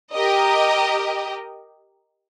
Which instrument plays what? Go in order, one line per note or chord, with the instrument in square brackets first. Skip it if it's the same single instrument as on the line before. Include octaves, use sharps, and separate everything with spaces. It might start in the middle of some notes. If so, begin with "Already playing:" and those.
[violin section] G4 A#4 D#5